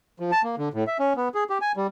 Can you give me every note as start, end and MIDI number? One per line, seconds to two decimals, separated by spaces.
0.20 0.31 53
0.32 0.42 81
0.43 0.55 58
0.58 0.69 50
0.74 0.84 45
0.87 0.98 76
0.99 1.13 61
1.17 1.29 59
1.35 1.44 68
1.50 1.58 67
1.61 1.72 80
1.77 1.87 55